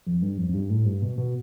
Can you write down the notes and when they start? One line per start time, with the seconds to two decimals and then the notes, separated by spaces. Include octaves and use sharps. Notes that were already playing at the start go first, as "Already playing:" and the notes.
0.06 F2
0.22 G2
0.38 F2
0.49 F2
0.54 G2
0.70 A2
0.85 G2
1.02 B2
1.18 B2